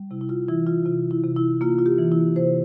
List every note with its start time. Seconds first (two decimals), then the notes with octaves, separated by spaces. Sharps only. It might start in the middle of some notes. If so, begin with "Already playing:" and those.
Already playing: G3
0.11 C3 E4
0.21 E4
0.29 F4
0.48 E3 E4
0.66 F4
0.86 C3 F4
1.11 E4
1.24 C3
1.37 E4
1.61 A#3 F4
1.79 F4
1.86 G4
1.98 E3
2.12 E4
2.36 C3 C5